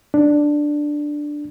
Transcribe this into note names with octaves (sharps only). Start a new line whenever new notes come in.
D4